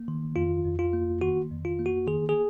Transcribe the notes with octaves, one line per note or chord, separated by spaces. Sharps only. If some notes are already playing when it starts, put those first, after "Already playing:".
Already playing: A#3
D#3
F2 F4
F2
F4
A#3
D#3 F#4
F2
F4
A#3
F#4
D#3 G#4
G#4